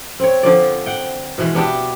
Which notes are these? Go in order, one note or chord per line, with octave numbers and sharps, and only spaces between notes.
C4 C#5
D3 F3 D5
F#5 G5
B2 E3 G#3
B3 D4 G4 E5